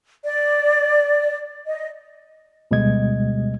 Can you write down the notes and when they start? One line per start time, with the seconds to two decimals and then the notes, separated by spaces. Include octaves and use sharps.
0.24 D5
1.66 D#5
2.71 D2 B2 G3 G#3 D#5 G#6